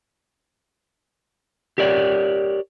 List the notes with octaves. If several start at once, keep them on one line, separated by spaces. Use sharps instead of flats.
G4 A#4 C#5 D5